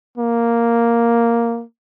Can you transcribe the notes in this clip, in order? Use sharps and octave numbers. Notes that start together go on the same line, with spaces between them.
A#3